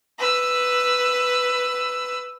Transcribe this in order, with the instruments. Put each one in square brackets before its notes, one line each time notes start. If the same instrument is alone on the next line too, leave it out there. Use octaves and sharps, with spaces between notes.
[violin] B4 E6